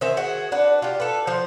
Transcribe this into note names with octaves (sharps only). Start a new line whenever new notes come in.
D#3 C5 E5 G#5
F#4 G#4
D4 F#4 B4
F4 G4
A4 B4
F3 C5